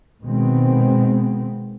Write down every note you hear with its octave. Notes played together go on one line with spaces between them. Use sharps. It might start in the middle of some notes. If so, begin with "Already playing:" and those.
B2 D#3 G#3 B3 C4